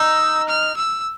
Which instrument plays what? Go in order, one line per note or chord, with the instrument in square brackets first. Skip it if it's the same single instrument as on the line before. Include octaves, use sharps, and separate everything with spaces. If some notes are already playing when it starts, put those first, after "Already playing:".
Already playing: [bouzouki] D#4 [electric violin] E6
[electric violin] F6
E6